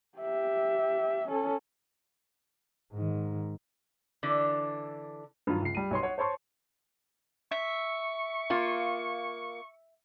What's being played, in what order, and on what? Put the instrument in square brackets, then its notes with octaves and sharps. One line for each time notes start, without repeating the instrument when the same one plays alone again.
[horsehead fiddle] G4 E5
C#4 A4
[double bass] G#2 D#3
[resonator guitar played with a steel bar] D3 E3 D4
[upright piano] G2 D#3 F#3 F4
C#2 C7
G3 D#7
B1 C#5 C6
C#5 F#5
C5 C#5 A5 C6 C#6
[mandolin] E5 [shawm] C#6
[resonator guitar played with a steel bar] A#3 F4